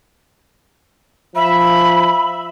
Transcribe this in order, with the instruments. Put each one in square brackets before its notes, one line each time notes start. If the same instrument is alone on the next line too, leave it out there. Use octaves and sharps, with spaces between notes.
[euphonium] F3 [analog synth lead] E5 [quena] B5